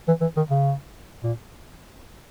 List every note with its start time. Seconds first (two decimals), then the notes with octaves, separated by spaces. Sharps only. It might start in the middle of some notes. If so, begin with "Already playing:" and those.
0.08 E3
0.22 E3
0.37 D#3
0.51 C#3
1.24 A#2